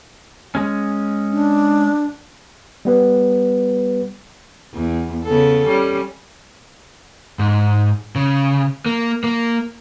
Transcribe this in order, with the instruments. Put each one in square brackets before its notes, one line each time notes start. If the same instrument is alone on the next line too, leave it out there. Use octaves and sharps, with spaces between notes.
[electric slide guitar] G#3 C#4
[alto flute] D4
[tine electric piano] G3 B3 B4
[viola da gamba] E2
C#3 B3 A4
G3 C#4
[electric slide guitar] G#2
C#3
A#3
A#3